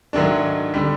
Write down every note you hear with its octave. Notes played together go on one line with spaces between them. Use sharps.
G#2 D#3 F#3 A3 D4
D3 G3